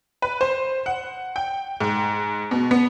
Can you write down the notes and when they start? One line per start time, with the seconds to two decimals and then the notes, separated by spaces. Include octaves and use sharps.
0.22 B4
0.41 C5
0.86 F#5
1.36 G5
1.81 G#2
2.51 B2
2.71 B3